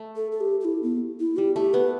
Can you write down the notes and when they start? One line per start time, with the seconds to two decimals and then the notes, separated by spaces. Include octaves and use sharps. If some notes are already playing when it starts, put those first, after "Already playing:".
Already playing: A3
0.16 A4
0.32 A4
0.41 G4
0.60 G4
0.65 E4
0.83 B3
1.20 E4
1.37 G3 G4
1.56 A3 G4
1.74 B3 B4